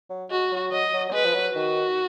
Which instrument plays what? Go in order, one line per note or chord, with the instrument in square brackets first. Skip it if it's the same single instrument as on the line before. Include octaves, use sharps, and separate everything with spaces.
[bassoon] F#3
[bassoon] G#3 [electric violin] F#4
[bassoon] F#3
[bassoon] F#3 [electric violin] D#5
[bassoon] F#3
F#3
[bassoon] G#3 [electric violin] B4
[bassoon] F3
F#3
[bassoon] D#3 [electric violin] F#4